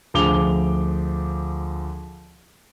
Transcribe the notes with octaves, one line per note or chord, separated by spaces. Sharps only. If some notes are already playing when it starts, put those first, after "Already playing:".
D2 F3 G#4 D6 F7 G7